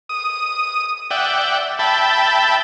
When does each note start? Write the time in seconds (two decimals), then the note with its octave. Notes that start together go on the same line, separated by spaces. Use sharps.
0.09 D#6
1.11 D5 E5 F#5 G5
1.79 E5 G5 A5 B5